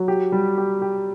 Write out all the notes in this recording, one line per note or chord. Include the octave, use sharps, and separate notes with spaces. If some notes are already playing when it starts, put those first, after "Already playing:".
Already playing: F#3
G4
G3
G4
G4